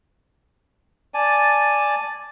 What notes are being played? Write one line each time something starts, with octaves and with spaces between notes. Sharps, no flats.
D5 G#5 A5